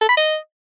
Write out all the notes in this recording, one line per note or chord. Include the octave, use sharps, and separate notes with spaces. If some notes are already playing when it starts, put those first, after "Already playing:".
A4
B5
D#5